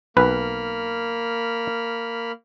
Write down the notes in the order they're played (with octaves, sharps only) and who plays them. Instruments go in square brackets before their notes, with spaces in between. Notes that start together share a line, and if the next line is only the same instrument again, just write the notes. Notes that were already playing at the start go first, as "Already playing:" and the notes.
[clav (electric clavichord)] B1 B4 [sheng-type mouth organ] A#3 B5 F6